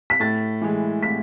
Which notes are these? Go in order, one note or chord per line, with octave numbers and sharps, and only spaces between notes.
B6
A2 A6
E3 G#3
A2 B6